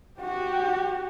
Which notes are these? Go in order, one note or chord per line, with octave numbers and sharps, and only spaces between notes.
F#4 G4